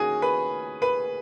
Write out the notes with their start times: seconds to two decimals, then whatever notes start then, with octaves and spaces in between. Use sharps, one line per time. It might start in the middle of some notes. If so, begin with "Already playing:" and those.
Already playing: D#3 A#3 C#4 F#4 G#4 A#4 G#5
0.22 B4 B5
0.82 B4 B5